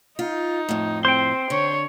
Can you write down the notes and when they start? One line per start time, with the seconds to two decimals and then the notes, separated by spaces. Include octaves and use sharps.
0.19 D#4 F4
0.69 F2 A2
1.05 C4 C5 G5 C6
1.50 D3 C#5